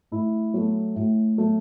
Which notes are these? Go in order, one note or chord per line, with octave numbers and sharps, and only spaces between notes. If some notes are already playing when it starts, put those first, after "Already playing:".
A2 E4
F#3 A3
A2
F#3 A3